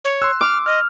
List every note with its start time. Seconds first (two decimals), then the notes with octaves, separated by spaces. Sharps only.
0.05 C#5
0.22 C6 E6 F#6
0.41 D6 F6
0.66 D#5 F6